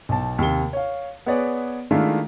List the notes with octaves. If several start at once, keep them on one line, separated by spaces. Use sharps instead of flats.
B1 A5
D#2 C3 G7
C#5 F5
B3 G#4 B4 C#5 D5 F#5
D#3 G#3 A3 D4 E4 F4